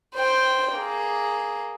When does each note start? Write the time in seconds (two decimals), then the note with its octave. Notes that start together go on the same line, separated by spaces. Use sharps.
0.15 C5 G5
0.74 A#3 G#4